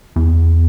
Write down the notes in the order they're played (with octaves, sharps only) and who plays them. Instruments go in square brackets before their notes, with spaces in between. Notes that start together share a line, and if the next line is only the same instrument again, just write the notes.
[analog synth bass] E2